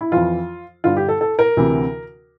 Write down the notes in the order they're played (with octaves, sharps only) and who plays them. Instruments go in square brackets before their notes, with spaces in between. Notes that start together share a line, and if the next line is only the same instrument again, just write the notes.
[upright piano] E4
F2 E3 F4
G2 D3 F4
G4
A4
A4
A#4
D2 C3 E3